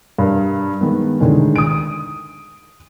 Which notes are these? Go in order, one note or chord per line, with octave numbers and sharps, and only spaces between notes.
G2 A#4
D#3 G#3 B3
A2 D3 D#3 G#3
D#6 D7